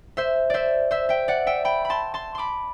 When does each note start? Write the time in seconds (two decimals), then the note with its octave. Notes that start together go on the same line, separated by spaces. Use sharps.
0.17 C5 E5
0.50 C5 D5 E5
0.91 C5 E5
1.09 E5 G5
1.28 D5 F#5
1.47 E5 G5
1.65 G5 B5
1.85 B5
1.90 A5 C6
2.14 A5 C6
2.35 B5 C6 D6